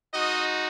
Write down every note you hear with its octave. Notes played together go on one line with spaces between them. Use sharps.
G#3 D#4 F#4 D#5